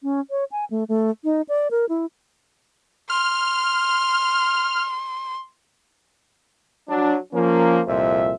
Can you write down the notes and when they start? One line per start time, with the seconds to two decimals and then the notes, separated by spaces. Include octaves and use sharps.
0.03 C#4
0.31 C#5
0.52 G#5
0.70 A3
0.89 A3
1.24 D#4
1.49 D5
1.71 A#4
1.89 E4
3.10 C6 F6
6.89 F#3 D4
7.33 F3 A#3 C#4
7.87 C2 F2 A#2 C5 E5